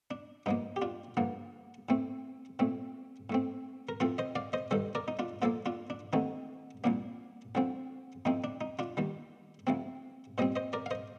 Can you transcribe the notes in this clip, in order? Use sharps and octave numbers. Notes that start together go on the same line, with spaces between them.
D4
G2 F3 A#3 D#4
G4
D4 F4
G2 D3 F3 A#3
A2 A3 C4
A#2 A3 C4
A2 A3 C4
A#4
A2 F3 C4 F4 A4
C5 D#5
D5 F5
C5 D#5
G2 D#3 G3 A4 C5
A#4 D5
D#4
D4 F4
A#2 F3 A#3 F4 A4
D4 F4
D4
D#2 D3 A3 C4 D#4
C2 A#2 F3 A#3 D4
D2 D3 F3 C4
A2 F3 C4 D#4
D4
D#4
D4 F4
D#2 D#3 G3
D2 C3 F3 C4
A#2 G3 C4 C5 D#5
C5 D#5
A#4 D5
F5
C5 D#5